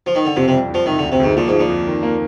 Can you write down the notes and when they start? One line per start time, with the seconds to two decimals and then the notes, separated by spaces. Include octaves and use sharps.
0.06 F3
0.15 D#3
0.25 D3
0.36 F2 C3
0.48 C3
0.53 G3
0.70 F2 F3
0.86 C3 D#3
0.98 D3
1.03 D2
1.12 C3
1.20 D2 G#2
1.36 A#2 F3
1.48 G#2
1.54 F3
1.59 A#2
1.69 F2
1.87 D#3
2.03 A#3